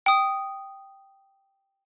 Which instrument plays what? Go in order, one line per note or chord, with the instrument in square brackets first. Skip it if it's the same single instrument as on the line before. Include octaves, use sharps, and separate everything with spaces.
[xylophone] G5 D#6